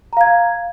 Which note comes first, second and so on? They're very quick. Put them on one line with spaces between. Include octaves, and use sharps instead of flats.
A#5 F5 G#6